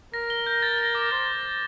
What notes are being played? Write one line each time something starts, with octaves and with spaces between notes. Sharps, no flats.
A#4 A#6
G7
G6
A6
G7
D6
C5 A6